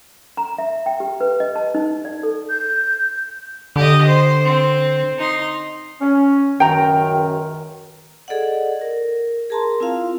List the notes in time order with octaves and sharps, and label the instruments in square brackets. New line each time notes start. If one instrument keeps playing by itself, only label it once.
[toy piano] A#5
E5
G5
G4
B4
D#5
A5
D#4
D5
A4
[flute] G6
[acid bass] D3 [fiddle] G4 D#5
[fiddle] C5
C4
D#4 C6
[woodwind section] C#4
[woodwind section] C#2 F#2 D#3 [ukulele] G5 A#5
[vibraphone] G#4 A4 D5 D#5 F#5
A#4
G#4 A#4 A5 A#5 C6
C4 E4 F4 F5